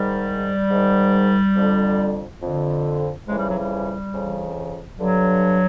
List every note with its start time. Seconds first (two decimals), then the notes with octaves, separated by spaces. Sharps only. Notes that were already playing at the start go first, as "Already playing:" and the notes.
Already playing: G#2 D#3 G3
0.71 G#2 D#3
1.57 F2 D3
2.42 F2 D3
3.28 F2 C#3 E3 G#3
3.39 G3
3.49 F#3
3.60 G3
4.13 F2 C#3 E3
4.99 G2 D3 F#3